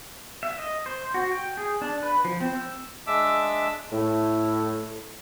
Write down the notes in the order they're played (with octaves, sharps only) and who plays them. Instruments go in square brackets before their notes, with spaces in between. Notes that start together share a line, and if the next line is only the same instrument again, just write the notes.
[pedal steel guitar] E5
D#5
C5
F#4
G5
G#4
D4
B4
F3
C4
E6
[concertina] G#3 D4 E5 D6 E6
[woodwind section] A2